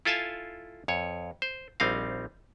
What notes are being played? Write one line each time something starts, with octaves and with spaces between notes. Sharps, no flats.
E4 F4 A4 F5 G#5 A5
F2 C#5
C5
A#1 G3 C4 D#4 F5